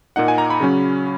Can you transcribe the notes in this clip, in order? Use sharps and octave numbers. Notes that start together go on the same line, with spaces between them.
A#2 A#3 D#4 F#5
G#5
A#5
B5
C#3 F#3 C#4